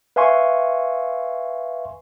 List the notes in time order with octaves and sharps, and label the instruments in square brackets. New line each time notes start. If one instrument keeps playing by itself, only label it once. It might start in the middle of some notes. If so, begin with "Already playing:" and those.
[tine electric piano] B4 E5 F5 G#5 C6 C#6